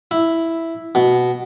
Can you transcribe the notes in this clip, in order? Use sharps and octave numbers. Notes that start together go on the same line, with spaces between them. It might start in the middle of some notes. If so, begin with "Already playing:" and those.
E4
B2